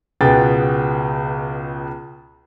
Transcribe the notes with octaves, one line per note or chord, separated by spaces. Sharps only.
C#2 B2 B3 G#4 G5 A6